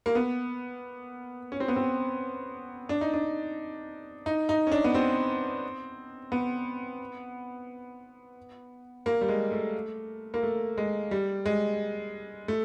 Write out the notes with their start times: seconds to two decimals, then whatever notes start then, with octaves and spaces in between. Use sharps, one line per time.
0.06 A#3
0.15 B3
1.52 C#4
1.60 C4
1.68 B3
1.76 C4
2.89 D4
3.01 D#4
3.14 D4
4.26 D#4
4.49 D#4
4.67 C#4
4.72 D4
4.84 B3
4.94 C4
6.32 B3
9.06 A#3
9.21 G3
9.29 G#3
9.51 A3
10.34 A#3
10.43 A3
10.78 G#3
11.11 G3
11.46 G#3
12.48 A3